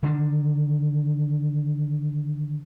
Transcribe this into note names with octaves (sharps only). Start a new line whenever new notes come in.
D3 D#3 A#3 D4